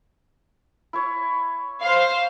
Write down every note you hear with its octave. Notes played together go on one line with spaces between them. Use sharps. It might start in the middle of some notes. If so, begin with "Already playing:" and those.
E4 C#5
C5 F5